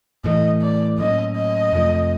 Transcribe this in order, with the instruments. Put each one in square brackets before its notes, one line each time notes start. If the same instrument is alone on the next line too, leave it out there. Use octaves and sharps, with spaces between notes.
[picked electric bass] A2 E3 A3 [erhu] D#5
[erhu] D5
[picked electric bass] A2 F#3 A#3 C#4 [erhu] D#5
[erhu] D#5
[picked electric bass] F2 C3 F3 A3